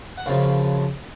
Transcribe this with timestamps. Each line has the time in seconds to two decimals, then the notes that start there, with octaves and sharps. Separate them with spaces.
0.18 F#5
0.26 F#2 C#3 F3 F5